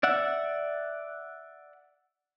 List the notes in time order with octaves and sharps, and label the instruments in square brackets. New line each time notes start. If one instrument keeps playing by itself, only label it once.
[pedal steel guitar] D5 E5 F#5